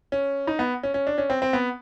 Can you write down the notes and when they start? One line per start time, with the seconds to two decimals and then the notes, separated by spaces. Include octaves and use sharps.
0.12 C#4
0.47 D#4
0.59 B3
0.83 C#4
0.94 C#4
1.07 D4
1.18 C#4
1.30 C4
1.42 C4
1.53 B3